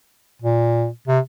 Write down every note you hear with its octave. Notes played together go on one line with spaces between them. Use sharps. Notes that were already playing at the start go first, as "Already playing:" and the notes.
A#2
C3